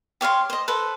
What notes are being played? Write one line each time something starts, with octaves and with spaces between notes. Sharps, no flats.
G4 C#5 F5 C6
C5 D#5
A4 B4 C5